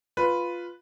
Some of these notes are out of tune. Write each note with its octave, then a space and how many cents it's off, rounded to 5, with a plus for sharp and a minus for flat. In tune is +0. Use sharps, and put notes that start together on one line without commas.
F4 +0 B4 +0